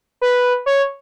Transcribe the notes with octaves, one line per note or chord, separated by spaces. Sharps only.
B4
C#5